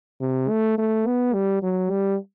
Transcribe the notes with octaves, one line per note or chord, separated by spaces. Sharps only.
C3
A3
A3
B3
G3
F#3
G3